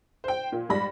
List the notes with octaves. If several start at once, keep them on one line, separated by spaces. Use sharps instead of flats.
C5 G5
A#2
G#2 G3 B5 A#6